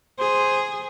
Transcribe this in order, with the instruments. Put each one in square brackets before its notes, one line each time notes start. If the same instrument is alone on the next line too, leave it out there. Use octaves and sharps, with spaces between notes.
[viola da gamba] G#4 [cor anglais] C5